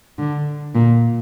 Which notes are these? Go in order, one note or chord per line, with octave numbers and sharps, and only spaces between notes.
D3
A#2